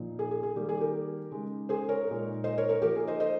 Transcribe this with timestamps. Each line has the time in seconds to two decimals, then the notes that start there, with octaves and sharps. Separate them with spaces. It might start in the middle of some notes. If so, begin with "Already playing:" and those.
Already playing: A#2 F3 A#3 D#4
0.19 G#4
0.31 G#4
0.43 G#4
0.56 D#3 G3 A#3 G4
0.69 G#4
0.81 G4 A#4
1.31 C#3 G#3 D#4
1.69 G#4 C5
1.89 A#4 C#5
2.07 A#2 G#3 D#4
2.44 C5 D#5
2.58 A#4 C#5
2.69 A#4 C#5
2.82 F3 A#3 D#4 G4 A#4
2.95 G#4
3.07 C5 D#5
3.20 C5 D#5